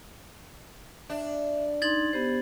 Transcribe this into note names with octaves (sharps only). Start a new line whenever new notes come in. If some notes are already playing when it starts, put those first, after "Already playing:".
D4 E5
D#4 C6 G#6 A6 F#7
B3 G4 C5